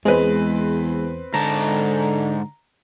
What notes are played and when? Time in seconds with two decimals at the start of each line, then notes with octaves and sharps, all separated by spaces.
0.05 E2 G#3 C4 B4
1.34 G#2 D3 A5 A#5